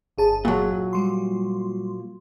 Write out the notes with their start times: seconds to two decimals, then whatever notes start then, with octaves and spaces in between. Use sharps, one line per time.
0.18 G1 G#4 A5
0.45 A#2 F#3
0.93 G3 C6